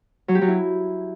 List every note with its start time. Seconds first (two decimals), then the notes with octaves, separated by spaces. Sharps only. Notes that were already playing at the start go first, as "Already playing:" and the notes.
0.28 F#3
0.35 G4
0.41 F#3
0.48 E4